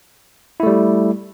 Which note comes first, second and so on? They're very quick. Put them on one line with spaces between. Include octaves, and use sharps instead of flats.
E4 A3 G3